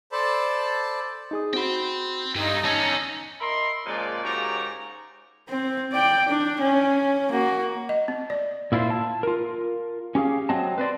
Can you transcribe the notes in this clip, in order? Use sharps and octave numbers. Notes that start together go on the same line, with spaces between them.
A4 C5 D5 A5 B5
D#4 G#4 D#6
C4 F#4 G5 B5 C6
G2 D#4 A4 G5
E2 D3 C#4 A5 E6 G#6
A#4 D#5 E5 B5 C6
A#2 C#3 F3 G#3 D5
G#2 C#3 F#4 G4 A#4 A#5
C4
D5 G5
D4
C#4
A#3 F#4
D#5
C4
D5
A#2 E4 F4 A#4 C5
A5
F4 A#4
C#4 G4 G#4 F5
F#3 C4 D#5 A5
B4 C5 D5